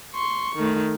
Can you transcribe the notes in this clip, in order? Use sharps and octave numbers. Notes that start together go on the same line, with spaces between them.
C6 C#6
D#3 A3